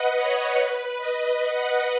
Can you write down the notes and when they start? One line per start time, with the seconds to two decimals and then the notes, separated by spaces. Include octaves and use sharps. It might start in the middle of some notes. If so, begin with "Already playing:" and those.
Already playing: B4 D#5 F#5
0.15 C#5
0.56 B4
0.97 D#5
1.39 F#5